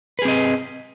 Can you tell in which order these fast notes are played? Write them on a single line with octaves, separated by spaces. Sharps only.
B4 G#4 C4 D#5